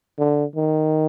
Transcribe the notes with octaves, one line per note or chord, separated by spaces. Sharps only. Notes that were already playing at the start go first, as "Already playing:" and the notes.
D3
D#3